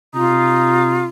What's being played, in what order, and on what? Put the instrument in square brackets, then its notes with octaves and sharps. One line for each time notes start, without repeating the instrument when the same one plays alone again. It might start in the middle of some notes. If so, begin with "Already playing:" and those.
[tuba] C3 [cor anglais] D#4 [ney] F4